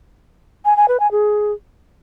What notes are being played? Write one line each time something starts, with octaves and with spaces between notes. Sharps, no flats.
G#5
G#5
B4
G#5
G#4